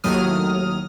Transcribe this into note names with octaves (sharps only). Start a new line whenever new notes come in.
D#2 A2 F#3 D#6 F6